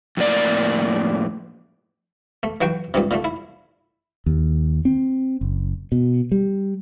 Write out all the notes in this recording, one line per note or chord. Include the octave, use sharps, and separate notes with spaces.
F2 A2 A#3 D5
A3
E3 F#3 F#5 G5 C#6
C#2 G2 C3
A#2 D3 A3
E4
D#2
C4
F#1
B2
G3